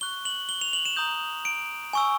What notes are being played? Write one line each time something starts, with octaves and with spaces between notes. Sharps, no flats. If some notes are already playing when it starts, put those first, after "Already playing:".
C#6 F#6 G7
F#7
G7
F7
F#7
E7
A#5 D#6 G6
D7
G#5 C#6 E6